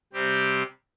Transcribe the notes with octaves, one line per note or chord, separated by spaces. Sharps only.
C3 G3 C4 G4